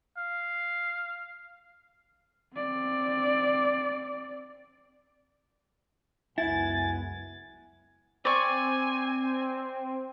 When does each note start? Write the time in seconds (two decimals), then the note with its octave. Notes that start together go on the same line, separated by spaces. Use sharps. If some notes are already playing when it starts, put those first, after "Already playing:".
0.18 F5
2.55 C4 D5
6.38 C#2 F#2 B3 E4 F#5 G#5 A6
8.25 C4 D5 G#5 C#6